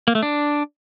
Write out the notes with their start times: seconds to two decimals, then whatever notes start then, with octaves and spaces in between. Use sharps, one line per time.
0.08 A#3
0.15 A3
0.23 D4